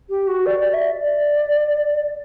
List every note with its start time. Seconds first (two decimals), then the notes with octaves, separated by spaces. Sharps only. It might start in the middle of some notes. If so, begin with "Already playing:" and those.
0.10 G4
0.27 F#4
0.46 D5
0.60 D5
0.74 E5
1.02 D5